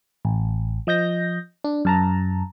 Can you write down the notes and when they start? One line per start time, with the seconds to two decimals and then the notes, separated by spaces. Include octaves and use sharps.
0.25 A1
0.87 F3 D#5 G6 A#6
1.64 D4
1.85 F#2 A5 A#5